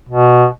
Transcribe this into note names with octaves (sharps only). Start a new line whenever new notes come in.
B2